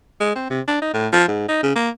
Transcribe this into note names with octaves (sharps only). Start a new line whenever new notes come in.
G#3
C4
C3
D4
D#4
A2
F3
G#2
D#4
C#3
A#3